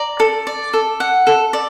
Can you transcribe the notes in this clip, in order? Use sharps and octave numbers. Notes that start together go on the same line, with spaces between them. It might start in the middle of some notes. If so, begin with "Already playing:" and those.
Already playing: D5 A#5
A4
D5
A4
F#5
A4
D5